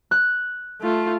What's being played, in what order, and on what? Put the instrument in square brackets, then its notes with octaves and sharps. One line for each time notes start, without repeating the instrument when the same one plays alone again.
[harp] F#6
[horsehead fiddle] A3 F4